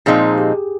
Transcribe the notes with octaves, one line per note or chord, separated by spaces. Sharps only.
A#2 F3 G#3 C4 D#4 G#4
G4